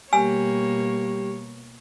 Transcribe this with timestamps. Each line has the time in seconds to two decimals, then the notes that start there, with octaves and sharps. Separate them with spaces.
0.13 B2 G3 A#3 G4 C#5 G#5